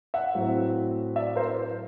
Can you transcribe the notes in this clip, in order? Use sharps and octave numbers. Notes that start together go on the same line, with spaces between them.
E5 F#5
A2 F#3 A3 C4
D5 E5
A#4 C5